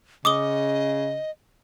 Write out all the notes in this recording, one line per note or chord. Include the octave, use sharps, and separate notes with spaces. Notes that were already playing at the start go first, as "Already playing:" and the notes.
C#3 D#5 D6 D#6 G7